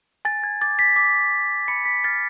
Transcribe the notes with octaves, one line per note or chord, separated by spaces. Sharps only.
G#5 A6
G#6
D6 A6
B6
D6 B6
G#5
B5 C#7
B6
F6 A6